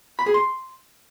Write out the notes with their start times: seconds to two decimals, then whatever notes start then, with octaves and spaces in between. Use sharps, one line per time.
0.19 B5
0.26 G#4
0.34 C6